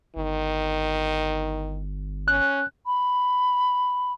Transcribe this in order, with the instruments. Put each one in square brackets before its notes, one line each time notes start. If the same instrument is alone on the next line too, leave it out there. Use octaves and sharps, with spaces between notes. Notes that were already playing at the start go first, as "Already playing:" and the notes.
[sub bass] G1 [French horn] D#3
[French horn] C#4 [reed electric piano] F#6
[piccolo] B5